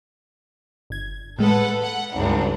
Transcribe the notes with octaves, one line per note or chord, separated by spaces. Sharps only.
G1 G#6
A2 G#3 A4 B4 F#5
F#5
G#1 C#2 G2